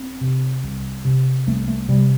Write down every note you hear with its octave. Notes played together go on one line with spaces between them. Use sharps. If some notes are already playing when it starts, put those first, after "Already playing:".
Already playing: C4
C3
C2
C3
C2 A3
A3
C3 G3